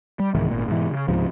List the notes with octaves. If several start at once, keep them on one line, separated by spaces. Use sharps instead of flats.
G3
C2 G#2 D#3 E3
G#1 A#2
G#2 B2 E3
C#3
C#2 G#2 C3 F3